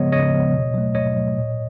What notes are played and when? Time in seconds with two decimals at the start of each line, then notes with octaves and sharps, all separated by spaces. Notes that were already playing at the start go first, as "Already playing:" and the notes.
Already playing: C#3 F3 G#3 B3 C#5 D#5
0.12 C#3 C#5 D#5
0.33 F3 G#3 B3
0.54 B2
0.74 F#3 A3
0.95 B2 C#5 D#5
1.15 F#3 A3
1.36 A#2